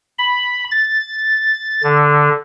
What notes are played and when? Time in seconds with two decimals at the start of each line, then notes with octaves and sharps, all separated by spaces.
0.19 B5
0.71 A6
1.83 D3